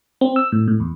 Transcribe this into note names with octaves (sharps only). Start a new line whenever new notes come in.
C4
E6
A2
A2
E2